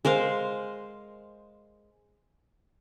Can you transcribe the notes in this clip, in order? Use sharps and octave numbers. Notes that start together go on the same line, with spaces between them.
G#3 A#4 C5 F5